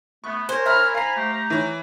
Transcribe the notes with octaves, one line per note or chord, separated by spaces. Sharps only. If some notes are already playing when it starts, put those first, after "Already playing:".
A3 B3 C#6
A#4 C5 C#5 G#5
E5 A#5 B5 F6
F5 G#5 A#5 B5 C7
A3 G4
E3 C#5